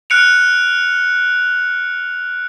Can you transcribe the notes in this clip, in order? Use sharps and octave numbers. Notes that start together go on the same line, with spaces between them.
F6 F#6 C#7 D7 F7